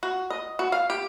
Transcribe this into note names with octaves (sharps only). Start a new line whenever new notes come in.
F#4
D#5
F#4
F5
G4